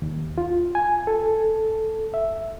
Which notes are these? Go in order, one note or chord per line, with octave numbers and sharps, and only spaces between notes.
D#2
F4
G#5
A4
E5